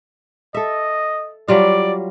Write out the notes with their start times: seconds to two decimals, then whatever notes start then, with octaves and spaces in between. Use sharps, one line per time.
0.54 A4 D#5 E5
1.48 F#3 G3 F4 D5